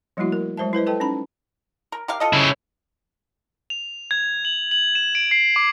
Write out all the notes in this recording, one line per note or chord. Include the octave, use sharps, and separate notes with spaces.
F3 G3 A3 A#3 E4 F#4
A#4
F#3 G#3 C5 E5 A5
E4 B4 C5 D#5
A4 B4 D#5 G5 A5
C#4 D#4 A5 B5
A#4
G4 A#4 F5
F4 A4 D#5
C#3 E4
F7
G#6
F#7
F#7
E7
D7
C7
D6